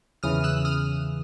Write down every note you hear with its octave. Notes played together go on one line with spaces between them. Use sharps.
E2 C#3 E3 D#6 F6
E6 F#6
D#6 F6